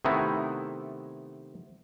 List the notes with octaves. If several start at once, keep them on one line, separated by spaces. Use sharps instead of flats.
C3 D#3 A3 B3 D#4 E4